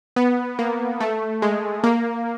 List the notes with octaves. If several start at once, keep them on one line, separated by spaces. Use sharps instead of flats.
B3
A#3
A3
G#3
A#3